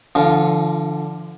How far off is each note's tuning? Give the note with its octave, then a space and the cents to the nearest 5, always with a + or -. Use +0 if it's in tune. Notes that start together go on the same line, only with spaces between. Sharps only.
D3 +0 F3 -40 F4 +0